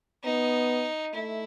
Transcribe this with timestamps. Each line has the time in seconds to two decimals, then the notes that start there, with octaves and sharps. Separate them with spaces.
0.24 B3 D#4
1.14 A3 E4